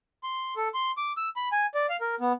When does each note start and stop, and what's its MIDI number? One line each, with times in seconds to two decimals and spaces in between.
0.23 0.54 84
0.56 0.68 69
0.74 0.91 84
0.97 1.12 86
1.17 1.29 88
1.36 1.49 83
1.52 1.66 80
1.75 1.86 74
1.89 1.97 77
2.01 2.15 70
2.20 2.32 59